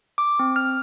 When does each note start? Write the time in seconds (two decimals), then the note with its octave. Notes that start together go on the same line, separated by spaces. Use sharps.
0.18 D6
0.39 C4
0.56 F6